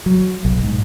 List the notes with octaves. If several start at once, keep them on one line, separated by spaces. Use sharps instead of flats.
F#3
B1
G#2